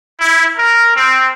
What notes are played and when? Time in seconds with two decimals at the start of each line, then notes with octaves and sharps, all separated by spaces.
0.20 E4
0.57 A#4
0.94 C4